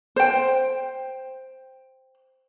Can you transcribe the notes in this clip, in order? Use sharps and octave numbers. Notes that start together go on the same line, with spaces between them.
C5 G5